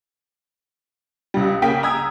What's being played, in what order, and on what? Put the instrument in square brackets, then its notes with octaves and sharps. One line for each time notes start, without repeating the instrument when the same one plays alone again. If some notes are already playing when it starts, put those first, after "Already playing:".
[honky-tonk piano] C#2 G3
C#3 A#3 G5 G#5 B6
A#5 D#6 E6 G#6